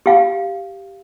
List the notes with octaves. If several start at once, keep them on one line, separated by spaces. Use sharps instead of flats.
G4 F5